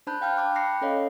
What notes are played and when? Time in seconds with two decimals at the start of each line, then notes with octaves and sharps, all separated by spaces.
0.07 D4 C5 A5 B5 F#6 G6
0.21 F5 G5 A5 F6 G6
0.37 G5 A5 B5 D6 F#6
0.55 B5 D6 F#6 A#6 C7 C#7
0.81 C#4 A4 C#5 D#5 F5